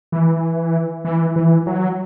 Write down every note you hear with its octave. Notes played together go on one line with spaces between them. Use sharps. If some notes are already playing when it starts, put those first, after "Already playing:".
E3
E3
E3
F#3